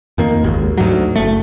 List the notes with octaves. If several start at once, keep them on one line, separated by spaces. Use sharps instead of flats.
F2 D#3 A#3
G#1 D#2
D2 G#2 F#3
F#1 A3